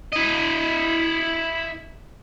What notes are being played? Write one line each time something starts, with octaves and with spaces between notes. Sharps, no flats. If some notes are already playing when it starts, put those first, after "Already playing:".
E4 D#5